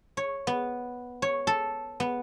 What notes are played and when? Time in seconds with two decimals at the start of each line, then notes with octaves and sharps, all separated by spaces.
0.17 C#5
0.47 B3
1.22 C#5
1.47 A4
2.00 B3